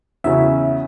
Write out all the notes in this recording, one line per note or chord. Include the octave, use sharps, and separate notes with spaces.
E2 C#3 C#4 E4 F#4 E5